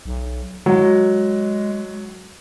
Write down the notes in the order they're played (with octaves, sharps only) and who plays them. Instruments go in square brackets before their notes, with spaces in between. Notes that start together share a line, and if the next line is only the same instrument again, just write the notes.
[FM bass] B1
[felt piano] F#3 [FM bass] G#3